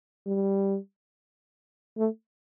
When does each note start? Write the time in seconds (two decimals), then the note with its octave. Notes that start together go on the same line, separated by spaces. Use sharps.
0.27 G3
1.98 A3